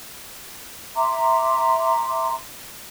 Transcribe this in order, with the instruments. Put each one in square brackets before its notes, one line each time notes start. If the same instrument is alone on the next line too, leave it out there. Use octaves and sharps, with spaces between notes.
[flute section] E5 A#5 C6 D6